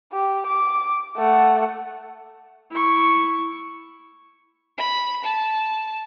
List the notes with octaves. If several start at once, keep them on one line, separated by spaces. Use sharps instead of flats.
G4
D6
A3 F#5
E4 C#6
B5
A5